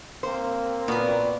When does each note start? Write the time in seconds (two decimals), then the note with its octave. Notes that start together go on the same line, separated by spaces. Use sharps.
0.23 A#3 C4 C5
0.88 A#2 B3 D4 F#4